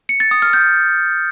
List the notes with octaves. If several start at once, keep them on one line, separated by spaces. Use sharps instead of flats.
C#7
A6
D#6
F6
G6